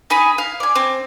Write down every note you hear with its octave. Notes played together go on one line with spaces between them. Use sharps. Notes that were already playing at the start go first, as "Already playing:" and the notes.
D#4 G#5 B5
F5
D5 G#5
C4